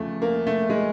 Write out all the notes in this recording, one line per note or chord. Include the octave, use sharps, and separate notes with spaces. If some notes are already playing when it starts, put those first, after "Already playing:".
Already playing: E2 C#3 F3 A3
A#3
A3
G#3